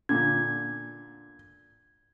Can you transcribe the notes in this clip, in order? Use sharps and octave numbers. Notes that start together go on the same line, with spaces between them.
A#2 D3 G#6